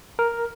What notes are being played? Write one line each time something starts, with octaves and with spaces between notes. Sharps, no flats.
A#4